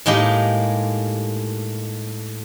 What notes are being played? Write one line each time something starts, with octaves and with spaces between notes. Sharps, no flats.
A2 G#3 A#3 D#4 G4